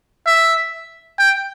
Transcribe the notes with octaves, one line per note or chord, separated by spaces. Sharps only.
E5
G5